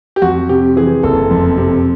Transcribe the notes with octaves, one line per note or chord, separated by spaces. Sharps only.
G4
F2 F#4
C3 G4
E3 G#4
F#1 A4
F2
C3